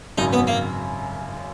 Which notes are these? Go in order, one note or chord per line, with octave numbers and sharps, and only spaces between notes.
G#1 F#2 C#3 D#4
B3
A#3